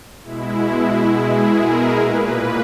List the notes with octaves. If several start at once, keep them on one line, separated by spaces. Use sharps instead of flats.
B2 G#3 E4
G#4
A#4
A#2 A#3 B4